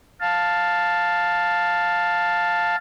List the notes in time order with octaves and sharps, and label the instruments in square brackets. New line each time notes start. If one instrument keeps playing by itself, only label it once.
[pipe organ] F5 A5